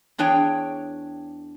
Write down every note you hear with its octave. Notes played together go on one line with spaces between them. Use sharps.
E2 D4 G#4 C#5 G5